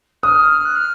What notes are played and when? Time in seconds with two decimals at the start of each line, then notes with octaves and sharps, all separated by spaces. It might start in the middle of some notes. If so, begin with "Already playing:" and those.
0.23 D#6 F6 F#6
0.65 F#6
0.76 F6